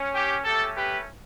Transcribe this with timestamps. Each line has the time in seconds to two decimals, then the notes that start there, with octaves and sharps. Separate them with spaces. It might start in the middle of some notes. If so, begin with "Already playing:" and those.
Already playing: C#4
0.14 G4
0.44 A3 C#4 G4 A4
0.75 G4 B4